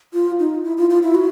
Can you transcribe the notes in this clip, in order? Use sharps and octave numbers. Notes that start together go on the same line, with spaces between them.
F4
D#4
E4
F4
F4
E4
F#4